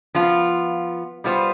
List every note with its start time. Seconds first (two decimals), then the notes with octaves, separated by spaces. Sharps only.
0.15 F3 B3 F4
1.24 G3 B3 F4 C5